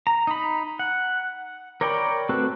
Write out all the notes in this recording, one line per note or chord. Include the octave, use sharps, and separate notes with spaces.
A#5
D#4 B5
F#5
A#4 C#5 D5 G5 B5
A3 C4 F#4 A4 B4